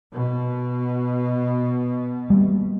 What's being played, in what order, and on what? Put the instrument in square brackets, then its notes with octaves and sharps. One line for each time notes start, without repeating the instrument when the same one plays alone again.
[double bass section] B2
[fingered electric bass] G3 A#3